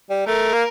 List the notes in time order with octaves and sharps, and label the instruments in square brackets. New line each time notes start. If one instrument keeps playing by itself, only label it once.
[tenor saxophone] G3
[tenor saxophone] A3 [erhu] A#4
[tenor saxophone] A#3